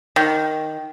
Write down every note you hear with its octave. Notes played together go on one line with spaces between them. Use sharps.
D#3